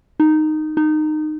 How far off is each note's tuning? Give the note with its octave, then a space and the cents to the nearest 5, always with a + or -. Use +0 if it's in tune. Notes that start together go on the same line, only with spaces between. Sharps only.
D#4 -10
D#4 -20